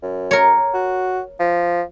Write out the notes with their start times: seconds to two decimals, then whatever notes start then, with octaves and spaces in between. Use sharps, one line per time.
0.03 F#2
0.31 A#4 C#5
0.74 F#4
1.40 F3